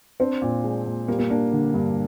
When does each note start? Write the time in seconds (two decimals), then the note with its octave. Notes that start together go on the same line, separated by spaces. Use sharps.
0.20 C4 D4
0.42 A#2
0.64 G#3
0.86 A#2
1.08 G3 A#3
1.19 A#3
1.30 A#3 D4
1.52 D3
1.74 G2